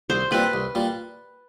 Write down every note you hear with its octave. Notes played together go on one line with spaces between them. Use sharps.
C2 C5
A#2 G3 C4 B4
C2
A#2 G3